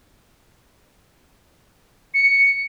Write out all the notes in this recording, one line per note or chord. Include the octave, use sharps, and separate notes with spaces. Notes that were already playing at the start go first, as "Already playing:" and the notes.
C#7